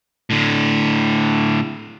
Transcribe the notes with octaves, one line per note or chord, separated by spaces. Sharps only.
A2 D3